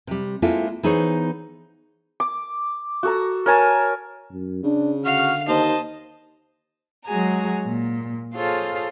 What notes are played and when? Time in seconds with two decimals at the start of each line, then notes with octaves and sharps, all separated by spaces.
0.07 C3 G3
0.42 G#3 A#3 C4 E4 F4 A4
0.83 E3 B3 D#4 G#4 C5 C#5
2.20 D6
3.03 F#4 A4 A#5
3.46 A#4 C#5 G#5 A5
4.32 F#2
4.64 C#3 D4
5.05 D3 F#4 F5 F6
5.48 D#2 C5 D#5 A5
7.05 F#3 G#3 F#4 G#4 G#5 A#5
7.65 A#2
8.35 F4 G#4 A4 C5 C#5 F5